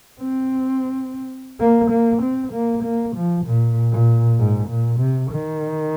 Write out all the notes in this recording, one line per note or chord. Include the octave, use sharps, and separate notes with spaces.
C4
A#3
A#3
C4
A#3
A#3
F3
A#2
A#2
G#2
A#2
C3
D#3